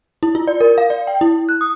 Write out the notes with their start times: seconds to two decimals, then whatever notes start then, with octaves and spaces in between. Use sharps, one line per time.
0.23 E4
0.35 F4
0.47 D5
0.61 A#4
0.78 F5
0.90 D5
1.07 G5
1.21 E4
1.49 F#6
1.61 D#6